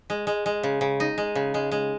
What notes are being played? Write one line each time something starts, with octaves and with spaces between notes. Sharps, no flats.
G#3
G#3
G#3
C#3
C#3
D#4
G#3
C#3
G#3
G#3